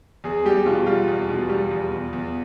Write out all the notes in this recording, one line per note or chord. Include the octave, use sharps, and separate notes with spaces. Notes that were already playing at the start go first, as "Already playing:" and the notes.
E2 G#4
G3 G4
B2 F4
G3 F4
E2
B2
G3
E2
E2
E2